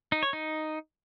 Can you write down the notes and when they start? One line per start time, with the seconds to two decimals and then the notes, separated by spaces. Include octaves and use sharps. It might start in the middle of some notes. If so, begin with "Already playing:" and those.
0.12 D#4
0.23 C#5
0.33 D#4